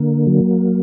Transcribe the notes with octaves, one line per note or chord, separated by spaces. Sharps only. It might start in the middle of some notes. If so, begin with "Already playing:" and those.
Already playing: D3 A#3
F#3